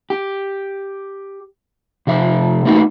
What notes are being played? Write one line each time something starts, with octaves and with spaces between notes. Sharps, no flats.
G4
C3 F3 E5
A3 A#3 D#4 F#4 B4